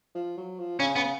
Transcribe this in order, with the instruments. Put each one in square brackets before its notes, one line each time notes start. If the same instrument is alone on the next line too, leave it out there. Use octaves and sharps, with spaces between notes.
[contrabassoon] F3
F#3
F3
[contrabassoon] C#3 [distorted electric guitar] C#4
[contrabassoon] C#3 [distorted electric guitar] B3